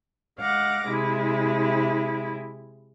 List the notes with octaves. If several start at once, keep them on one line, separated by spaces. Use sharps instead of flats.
G#3 F5 F#5 D6 A#6
C3 G#3 E4